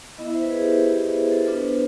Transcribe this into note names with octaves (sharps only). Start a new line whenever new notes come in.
B3 E4 D#5
E5
C5
B4
G#4
G4
G4
G#4
A4
C5
B3 D4 F4 B4